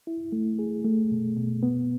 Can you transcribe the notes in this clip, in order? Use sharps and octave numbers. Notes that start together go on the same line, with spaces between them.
E4
A3
G#4
A3
B2
B2
B3